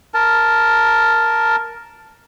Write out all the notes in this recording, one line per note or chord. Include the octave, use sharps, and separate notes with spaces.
A#4 A5